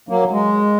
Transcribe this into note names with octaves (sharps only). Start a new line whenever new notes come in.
F#3 A#3
G#3